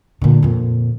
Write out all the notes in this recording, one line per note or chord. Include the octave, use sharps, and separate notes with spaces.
A#2 D3
F2 A#2